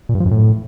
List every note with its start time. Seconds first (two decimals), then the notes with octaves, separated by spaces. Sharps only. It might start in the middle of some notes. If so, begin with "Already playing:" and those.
0.09 A#2
0.15 G2
0.20 F3
0.26 F#2
0.31 A2